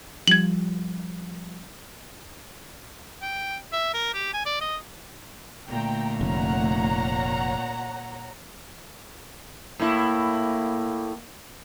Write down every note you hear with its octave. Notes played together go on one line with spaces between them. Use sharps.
F3 G3 G#6 F#7
G5
E5
A#4
G4
G#5
D5
D#5
A#2 D3 A3 G5 A#5
F1 C#5 F#5 A#5
A2 A#3 E4